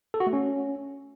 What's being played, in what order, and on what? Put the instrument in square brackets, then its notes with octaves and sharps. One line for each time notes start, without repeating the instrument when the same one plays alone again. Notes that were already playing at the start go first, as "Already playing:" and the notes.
[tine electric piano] A4
F#4
A3
C#4